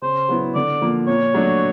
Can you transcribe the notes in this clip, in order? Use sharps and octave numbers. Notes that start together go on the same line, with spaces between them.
C#3 C5
F#3 B3 E4
D3 D5
F3 A#3
A#2 C#5
F#3 A3 D4 F#4